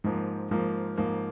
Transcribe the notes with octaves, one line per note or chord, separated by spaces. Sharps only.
G#2 F3 A#3
G#2 F3 A#3
G#2 F3 A#3